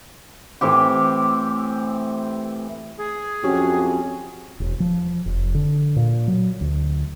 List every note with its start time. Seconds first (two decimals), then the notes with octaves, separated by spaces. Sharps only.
0.61 A2 E3 C4 G4
2.98 G#4
3.44 F2 C#4 F#4 G4
4.60 E1
4.80 F3
5.26 F1
5.55 D3
5.96 A#2
6.28 F#3
6.61 D2